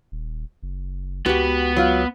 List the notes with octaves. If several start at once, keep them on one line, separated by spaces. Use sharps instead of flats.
D#1
F#1
C#2 B3 F#4 G4
F#3 F4